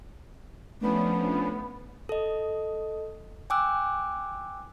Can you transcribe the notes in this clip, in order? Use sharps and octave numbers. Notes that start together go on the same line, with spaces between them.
F3 A3 B3 C#4 D4
A4 D#5
G5 G#5 D6 E6 F#6